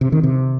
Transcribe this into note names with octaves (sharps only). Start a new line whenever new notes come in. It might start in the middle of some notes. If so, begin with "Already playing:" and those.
C3
D#3
C3